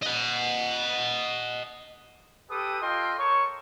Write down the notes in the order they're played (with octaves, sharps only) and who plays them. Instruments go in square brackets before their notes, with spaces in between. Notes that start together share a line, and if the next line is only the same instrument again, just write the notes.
[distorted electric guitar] D#5 F#5
[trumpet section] G4 A4 B4 G5 D#6
F4 A4 D#5 F5 G5 C6
A4 A#4 C#5 C#6